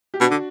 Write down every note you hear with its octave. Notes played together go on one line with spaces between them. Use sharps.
G4
B2 D4 F#4
D3